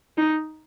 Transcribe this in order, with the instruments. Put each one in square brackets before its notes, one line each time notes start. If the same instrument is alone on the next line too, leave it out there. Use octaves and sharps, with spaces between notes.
[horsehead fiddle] D#4